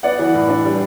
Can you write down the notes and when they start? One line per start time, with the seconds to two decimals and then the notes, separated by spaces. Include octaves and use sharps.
0.03 B3 D5 F#5
0.19 E3
0.34 A2
0.49 D4
0.65 G3